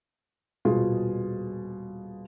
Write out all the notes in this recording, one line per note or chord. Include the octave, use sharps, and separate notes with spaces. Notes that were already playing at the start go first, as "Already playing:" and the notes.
D#1 B2 F4 G#4